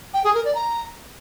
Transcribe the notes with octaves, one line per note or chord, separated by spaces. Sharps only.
G5
G#4
A#4
D5
A#5